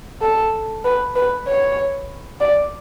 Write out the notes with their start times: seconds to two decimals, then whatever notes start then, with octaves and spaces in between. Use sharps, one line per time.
0.22 A4
0.85 B4
1.16 B4
1.48 C#5
2.40 D5